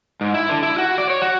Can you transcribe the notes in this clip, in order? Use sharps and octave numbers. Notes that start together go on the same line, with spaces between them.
G#2
E4
D3
E4
F#4
D5
C#5
F#4